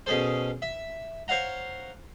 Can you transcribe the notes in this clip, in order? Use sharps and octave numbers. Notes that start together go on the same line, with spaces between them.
B2 C#4 G#4 A4 C5
E5
C5 C#5 F5 F#5 A#5